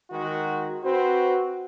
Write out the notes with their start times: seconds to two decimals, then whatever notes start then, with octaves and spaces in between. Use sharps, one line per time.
0.11 D#3 G#3 F#4
0.84 C4 F#4 B4 C5